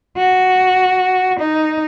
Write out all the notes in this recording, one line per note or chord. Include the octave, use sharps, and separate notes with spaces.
F#4
D#4